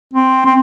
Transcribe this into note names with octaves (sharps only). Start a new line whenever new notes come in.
C4
C4